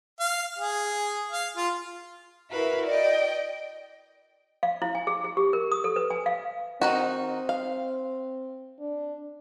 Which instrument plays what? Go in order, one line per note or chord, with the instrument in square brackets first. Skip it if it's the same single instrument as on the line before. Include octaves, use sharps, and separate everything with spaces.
[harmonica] F5
G#4
F5
F4
[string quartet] E4 F#4 A#4 B4 E5 F5
D5 D#5 G5
[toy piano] F5
E4
G#5
G#4
G#4
G4
A#4
D#6
A4
B4
G#5
F5
[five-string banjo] D#3 D#4 F#4 [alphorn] C4
[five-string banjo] F5
[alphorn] D4